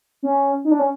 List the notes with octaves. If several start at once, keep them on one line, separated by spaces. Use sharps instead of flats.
C#4
D#4
D4
C#4